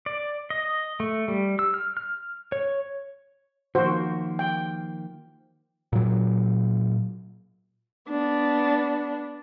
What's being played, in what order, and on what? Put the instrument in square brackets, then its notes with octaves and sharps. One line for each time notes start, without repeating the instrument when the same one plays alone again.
[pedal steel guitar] D5
D#5
A3
G3
E6
F6
F6
C#5
[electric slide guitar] D#3 F3 A#3 [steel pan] F#4 C5
[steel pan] G5
[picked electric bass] A#2 F#3
[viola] B3 D4